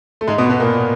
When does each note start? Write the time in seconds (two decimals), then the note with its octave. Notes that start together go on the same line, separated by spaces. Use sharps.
0.21 A3
0.27 G#2 G#3
0.38 B2 B3
0.49 B2 B3
0.60 A#2 A#3